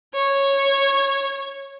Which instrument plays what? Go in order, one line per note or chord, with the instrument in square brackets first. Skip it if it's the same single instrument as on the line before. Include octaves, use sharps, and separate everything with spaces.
[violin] C#5 G#6